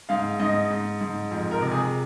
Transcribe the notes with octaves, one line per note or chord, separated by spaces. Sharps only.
G#2 F5
G#2 D#5
G#2
G#2
F2
A#4
C3
G#4